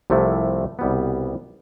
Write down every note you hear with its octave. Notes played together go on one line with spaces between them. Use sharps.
C2 C3 F3 A3 E4
C2 B2 G3 B3